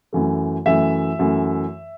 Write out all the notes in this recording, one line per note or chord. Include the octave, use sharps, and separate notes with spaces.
F#2 E3 A3
F#2 E3 A3 E5
F#2 E3 A3